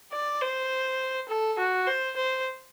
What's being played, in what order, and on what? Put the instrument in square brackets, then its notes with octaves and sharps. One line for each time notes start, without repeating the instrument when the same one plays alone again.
[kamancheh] D5
C5
A4
F#4
C5
C5